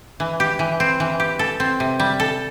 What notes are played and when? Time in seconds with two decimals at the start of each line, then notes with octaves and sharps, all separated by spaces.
0.20 E3
0.40 G4
0.59 E3
0.80 C4
1.00 E3
1.20 G4
1.39 A4
1.60 C4
1.80 C3
2.00 G3
2.20 A4